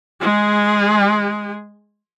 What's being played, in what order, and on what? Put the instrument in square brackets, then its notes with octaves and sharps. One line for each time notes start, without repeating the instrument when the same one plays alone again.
[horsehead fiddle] G#3 G#4